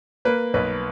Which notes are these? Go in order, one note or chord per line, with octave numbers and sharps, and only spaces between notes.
A#3 B4
B1 B4